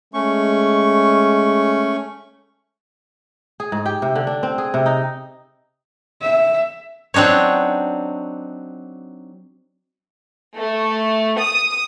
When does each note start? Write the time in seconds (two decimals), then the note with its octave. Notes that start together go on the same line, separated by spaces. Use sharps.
0.14 G#3 A3 C#4 C#6
3.60 G#4
3.72 G#2
3.86 G4
4.02 C3
4.16 D3
4.27 D4
4.43 C4
4.58 G#4
4.74 C3
4.86 D#4
6.22 E5
7.14 F#3 C4 D4 D#4 C#5
10.56 A3
11.40 D#6